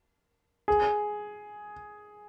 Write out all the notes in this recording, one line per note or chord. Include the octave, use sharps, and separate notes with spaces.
G#4